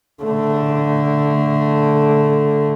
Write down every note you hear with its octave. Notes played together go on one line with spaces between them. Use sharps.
D3 A3